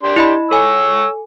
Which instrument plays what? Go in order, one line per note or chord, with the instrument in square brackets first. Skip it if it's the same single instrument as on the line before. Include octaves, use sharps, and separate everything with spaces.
[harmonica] D4 G4 C6
[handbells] E4 D#5 B5
[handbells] A4 G#5 [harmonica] C#5 C#6 E6